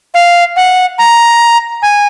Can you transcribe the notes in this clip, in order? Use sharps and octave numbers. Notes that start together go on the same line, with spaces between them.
F5
F#5
A#5
G#5